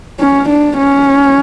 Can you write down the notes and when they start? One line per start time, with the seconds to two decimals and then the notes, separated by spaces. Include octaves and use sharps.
0.20 C#4
0.49 D4
0.78 C#4